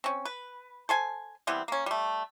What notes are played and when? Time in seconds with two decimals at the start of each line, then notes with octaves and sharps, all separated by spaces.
0.04 C4 C#4
0.25 B4
0.89 A4 C5 G#5
1.47 E3 G3 B3 C4
1.68 A#3 C#4
1.86 G3 A3